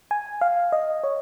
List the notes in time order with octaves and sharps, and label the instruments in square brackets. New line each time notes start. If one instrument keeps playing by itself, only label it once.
[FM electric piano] G#5
F5
D#5
C#5